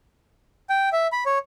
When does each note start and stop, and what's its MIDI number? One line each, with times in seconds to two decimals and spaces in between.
0.70 0.89 79
0.92 1.07 76
1.12 1.24 83
1.26 1.38 73